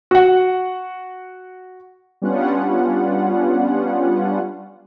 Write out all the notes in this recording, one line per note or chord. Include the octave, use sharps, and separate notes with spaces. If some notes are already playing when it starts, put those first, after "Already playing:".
F#4 F#5
G3 B3 C#4 D4 F4 F#5